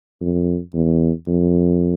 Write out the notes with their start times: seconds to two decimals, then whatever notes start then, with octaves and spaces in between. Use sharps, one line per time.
0.21 F2
0.74 E2
1.28 F2